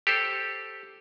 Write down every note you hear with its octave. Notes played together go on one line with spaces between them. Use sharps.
G4 A4 C5